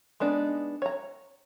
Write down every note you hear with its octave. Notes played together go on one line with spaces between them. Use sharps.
G#3 B3 D4 D#4
C#5 A#5